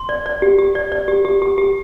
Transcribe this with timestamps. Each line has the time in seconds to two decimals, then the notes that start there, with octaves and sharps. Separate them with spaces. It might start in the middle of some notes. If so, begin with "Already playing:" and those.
Already playing: C6
0.09 D5
0.26 D5
0.42 G4
0.59 G4
0.75 D5
0.92 D5
1.08 G4
1.25 G4
1.42 G4
1.58 G4